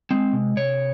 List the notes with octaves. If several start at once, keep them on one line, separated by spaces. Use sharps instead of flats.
G#3 C4
C3
C3 C#5